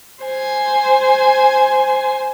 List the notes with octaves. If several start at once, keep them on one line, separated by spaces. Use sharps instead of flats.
C5 G#5